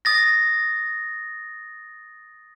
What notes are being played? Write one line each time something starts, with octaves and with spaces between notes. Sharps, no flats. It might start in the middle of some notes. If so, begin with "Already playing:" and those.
D#6 A6 A#6